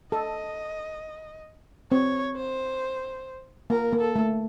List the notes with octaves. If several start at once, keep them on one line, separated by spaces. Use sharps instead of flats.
A4 D#5
C4 C#5
C5
A#3 A#4
A#3
A4
A3